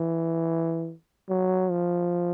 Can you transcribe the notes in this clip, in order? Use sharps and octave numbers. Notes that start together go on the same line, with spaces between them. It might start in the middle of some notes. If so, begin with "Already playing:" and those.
Already playing: E3
F#3
F3